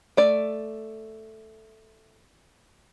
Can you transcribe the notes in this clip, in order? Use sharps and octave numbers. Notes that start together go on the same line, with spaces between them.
A3 D5